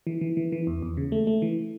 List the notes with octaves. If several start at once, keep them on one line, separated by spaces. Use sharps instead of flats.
E3
E3
E3
E3
E2
E2
C#3
A3
A3
E3